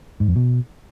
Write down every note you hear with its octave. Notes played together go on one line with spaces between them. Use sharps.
G#2
F2
B2